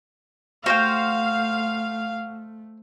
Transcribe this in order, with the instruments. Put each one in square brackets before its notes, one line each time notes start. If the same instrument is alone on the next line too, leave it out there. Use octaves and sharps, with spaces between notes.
[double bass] A3 [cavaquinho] F#4 [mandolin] C5 G5 [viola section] F5